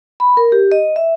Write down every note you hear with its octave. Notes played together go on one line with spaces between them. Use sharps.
B5
A#4
G4
D#5
E5